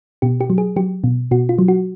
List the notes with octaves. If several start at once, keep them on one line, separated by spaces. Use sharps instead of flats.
B2 G4
G4
F#3
G#4
F#3 G4
B2
B2 F#4
F4
F#3
F#4